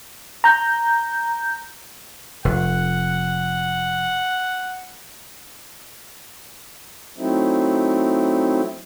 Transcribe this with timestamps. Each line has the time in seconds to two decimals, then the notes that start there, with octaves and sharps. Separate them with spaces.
0.44 A#5 G6
2.45 F1 F#5
7.18 F#3 A3 C4 D#4 E4